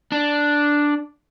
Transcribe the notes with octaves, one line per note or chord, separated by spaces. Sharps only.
D4